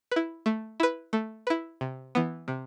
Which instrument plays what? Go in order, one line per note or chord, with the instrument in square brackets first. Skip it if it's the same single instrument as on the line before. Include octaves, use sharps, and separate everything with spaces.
[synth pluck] E4 B4
A3
E4 B4
A3
E4 B4
C3
E3 B3
C3